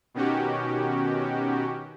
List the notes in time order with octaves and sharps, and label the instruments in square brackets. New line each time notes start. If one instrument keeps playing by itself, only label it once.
[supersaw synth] B2 D#3 C#4 F#4 G4